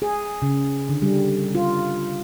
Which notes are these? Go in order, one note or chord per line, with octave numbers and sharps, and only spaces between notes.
G#4
C#3
D3
G3
F4